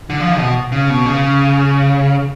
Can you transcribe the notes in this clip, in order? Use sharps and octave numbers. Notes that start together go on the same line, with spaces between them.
D3
F3
B2
C#3
B2
C#3